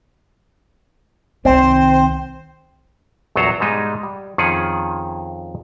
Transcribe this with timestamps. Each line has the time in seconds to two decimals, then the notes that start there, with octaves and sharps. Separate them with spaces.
1.45 C2 D#3 C4 C5
3.36 A#1 E2 F#3 A4 C5 A#5
3.60 G#2 B2 G3 G#3 D#4
4.03 G3
4.38 F2 D#3 F3 C#4 G#4 F#5